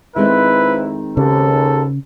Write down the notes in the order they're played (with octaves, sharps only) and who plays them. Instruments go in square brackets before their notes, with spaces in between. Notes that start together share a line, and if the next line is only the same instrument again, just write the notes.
[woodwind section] F2 E4 [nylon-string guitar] D#3 G#3 C4 [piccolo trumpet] B4
[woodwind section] D#2 G#2 [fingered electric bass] C#3 [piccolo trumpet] A4